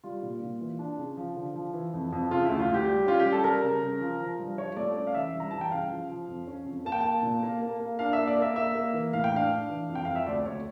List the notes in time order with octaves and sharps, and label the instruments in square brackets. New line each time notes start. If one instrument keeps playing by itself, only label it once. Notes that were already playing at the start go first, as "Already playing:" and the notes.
[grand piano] G3 F4
A#2
A#2
E3
D4
C#3
F3
D3
F3
E3
F2
F2
C#3 F4
D2 E4
F4
D2 G4
G3
C#4 F4
G4
G3
A4
G3 A#4
C#3
C#3
F3
F3
G2
F3 C#5
A3 D5
C#4 D5
F5
E3 E5
G2
A#5
E3 A5
G5
C#3 F5
F3
F3
F2
C#4
F2
A#3 A5
G5
A#3 A5
A#2
A#3
A#3
A#3
D4 F5
E5
A#3
D5
A#3
E5
A#3 E5
A#3
E3
A2 F5
G5
D4 F5
D4
E3
F2
G5
F2 F5
E5
D2 D5
D2 C#5